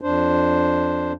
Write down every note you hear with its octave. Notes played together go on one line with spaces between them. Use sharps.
F2 D4 C5